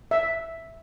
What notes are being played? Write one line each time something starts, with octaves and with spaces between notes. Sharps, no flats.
E5